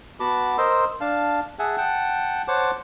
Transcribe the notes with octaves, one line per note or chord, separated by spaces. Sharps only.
B3 F#4 A5 B5 D6
A#4 C5 D#5 C6 E6
D4 F5 A5
G#4 E5 F#5 G#5 A5
F#5 G5 A5
C5 C#5 F#5 A5 D6